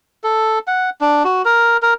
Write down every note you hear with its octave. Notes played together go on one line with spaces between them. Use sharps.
A4
F#5
D4
F#4
A#4
A#4